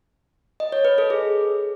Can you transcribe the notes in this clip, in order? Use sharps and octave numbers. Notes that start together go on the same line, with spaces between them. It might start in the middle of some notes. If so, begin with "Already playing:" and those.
D#5
C#5
B4
A4
G#4